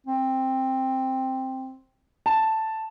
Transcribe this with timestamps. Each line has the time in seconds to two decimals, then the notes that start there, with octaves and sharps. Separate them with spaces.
0.07 C4
2.26 A5